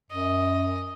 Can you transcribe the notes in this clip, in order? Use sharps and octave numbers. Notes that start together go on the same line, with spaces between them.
F#2 D#5